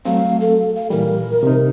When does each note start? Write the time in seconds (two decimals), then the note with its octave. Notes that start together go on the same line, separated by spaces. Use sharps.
0.05 F#3 A3 C4 F5
0.41 A4
0.76 F5
0.90 A#2 E3 G3 A#4
1.43 C3 D#4